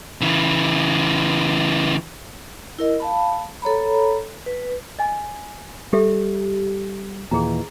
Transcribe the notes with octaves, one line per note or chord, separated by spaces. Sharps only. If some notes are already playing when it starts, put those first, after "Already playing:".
C#3 E3
E4 A#4 D#5
F5 A5 B5
A4 C#5 A#5 B5
B4
D#5 G#5
G3 G4 A4 E5
D#2 A#2 E3 G#4 A#5